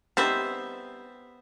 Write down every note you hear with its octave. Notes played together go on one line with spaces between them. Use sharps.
G3 B3 C4 D#4 C5 E5